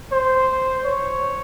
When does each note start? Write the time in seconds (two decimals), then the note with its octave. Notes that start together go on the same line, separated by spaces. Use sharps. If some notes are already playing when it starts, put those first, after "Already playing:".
0.12 C5
0.85 C#5